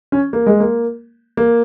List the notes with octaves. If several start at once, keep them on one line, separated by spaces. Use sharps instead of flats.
C#4
A#3
G#3
A#3
A#3